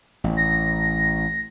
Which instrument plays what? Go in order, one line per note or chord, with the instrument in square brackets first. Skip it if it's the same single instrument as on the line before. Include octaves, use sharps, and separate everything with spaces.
[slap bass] A1
[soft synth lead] A#6